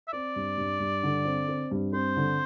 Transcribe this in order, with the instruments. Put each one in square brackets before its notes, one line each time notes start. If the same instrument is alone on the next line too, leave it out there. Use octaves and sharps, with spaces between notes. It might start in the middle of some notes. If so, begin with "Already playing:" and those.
[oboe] E5
[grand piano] C4 [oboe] D5
[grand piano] G2
G2
G2
D3
C4
C4
G2
[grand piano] C4 [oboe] C5
[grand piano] D3